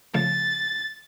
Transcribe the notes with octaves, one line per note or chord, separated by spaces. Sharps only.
C#3 F3 A3 A6